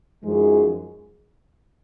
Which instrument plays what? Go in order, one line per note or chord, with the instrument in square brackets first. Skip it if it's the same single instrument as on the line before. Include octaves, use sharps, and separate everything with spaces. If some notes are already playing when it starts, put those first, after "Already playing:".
[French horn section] F#2 F3 G#3 D#4 G#4